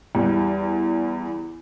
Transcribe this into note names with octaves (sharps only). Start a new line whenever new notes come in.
E2 G3